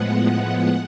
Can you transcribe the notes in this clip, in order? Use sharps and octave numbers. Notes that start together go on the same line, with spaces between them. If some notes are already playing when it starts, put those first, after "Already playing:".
Already playing: A2 F3 G#3 B3 F#5